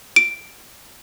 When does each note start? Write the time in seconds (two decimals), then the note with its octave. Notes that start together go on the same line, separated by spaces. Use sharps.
0.16 D7